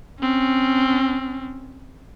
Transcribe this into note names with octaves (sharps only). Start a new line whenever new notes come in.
C4 C#4